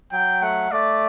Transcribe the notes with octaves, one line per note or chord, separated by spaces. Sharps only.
F#3 G5
A3 F#5
A3 D5